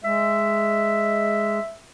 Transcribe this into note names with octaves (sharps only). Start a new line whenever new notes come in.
G#3 E5